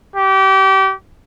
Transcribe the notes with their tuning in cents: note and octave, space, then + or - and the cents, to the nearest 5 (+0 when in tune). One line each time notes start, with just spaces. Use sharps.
G4 -30